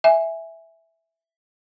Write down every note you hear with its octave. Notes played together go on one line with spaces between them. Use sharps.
E5 G#5